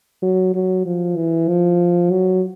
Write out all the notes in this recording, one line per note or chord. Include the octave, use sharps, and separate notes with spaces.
F#3
F#3
F3
E3
F3
F#3